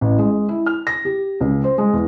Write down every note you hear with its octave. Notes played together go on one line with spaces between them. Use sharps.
A1
G#3
E4
F6
A#6
G4
C#2
C5
G#3
E2